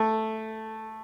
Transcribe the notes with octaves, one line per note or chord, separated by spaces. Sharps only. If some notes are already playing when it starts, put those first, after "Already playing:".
Already playing: A3